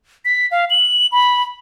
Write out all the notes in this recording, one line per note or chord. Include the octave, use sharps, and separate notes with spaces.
B6
F5
F#7
B5